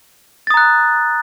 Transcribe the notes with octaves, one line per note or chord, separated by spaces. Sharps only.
A#5 D#6 F#6 A6